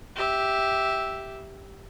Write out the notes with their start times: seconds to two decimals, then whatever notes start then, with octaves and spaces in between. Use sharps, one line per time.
0.16 G4 E5